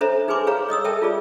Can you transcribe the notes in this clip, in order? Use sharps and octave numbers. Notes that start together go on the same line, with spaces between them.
D4 A4 C5 C#5 E5 A#5
D#4 G#4 B4 G#5 C6 D6
G#4 B4 C#5 F5 A#5
C#5 D#5 D#6 E6
A4 A#4 E5 G5 A5
F4 G#4 D5